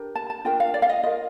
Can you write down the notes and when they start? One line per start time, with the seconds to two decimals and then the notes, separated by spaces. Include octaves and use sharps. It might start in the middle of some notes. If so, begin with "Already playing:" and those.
Already playing: D4 G4 A#4
0.15 A5
0.30 A5
0.45 D4 F4 A#4 G5
0.60 F5
0.74 D5
0.82 F5
0.89 D#5
1.03 F4 A#4 D#5